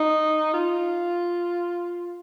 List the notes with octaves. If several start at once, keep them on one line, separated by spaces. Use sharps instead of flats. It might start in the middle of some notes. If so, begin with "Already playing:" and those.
Already playing: D#4
F4